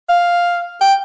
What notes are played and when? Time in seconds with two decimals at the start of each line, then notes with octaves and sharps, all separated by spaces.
0.09 F5
0.81 G5